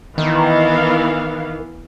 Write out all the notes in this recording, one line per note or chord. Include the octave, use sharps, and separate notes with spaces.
D#3 E3 B3 F5